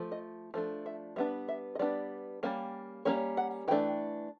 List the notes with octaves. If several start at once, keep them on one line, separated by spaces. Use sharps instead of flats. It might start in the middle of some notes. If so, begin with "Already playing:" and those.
Already playing: F3 A3
D#5
F3 A3 D4
E5
G3 B3 D4 E5
E5
D#5
G3 B3 D4 D5
G3 A#3 C#4
G3 A#3 C#4 C#5
F#5
E3 A3 D4 G5